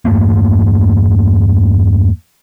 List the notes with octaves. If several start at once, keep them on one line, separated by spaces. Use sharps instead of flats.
E2 G2 A3 A#3